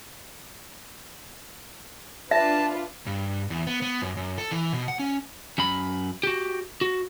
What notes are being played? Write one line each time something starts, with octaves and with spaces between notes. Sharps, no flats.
D4 F4 B4 E5 A5
G2
E2
B3
B3
F#2
F#2
A4
E3
B2
F#5
C#4
F#2 B5
F#4 G4
F#4